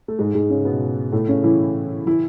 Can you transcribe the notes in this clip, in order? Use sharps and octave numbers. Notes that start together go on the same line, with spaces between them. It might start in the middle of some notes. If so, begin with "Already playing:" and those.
A3
G#2 G#3
G#2 G#3
C#3 C#4
B2 B3
A2 A3
C#3 C#4
E3 E4
E3 E4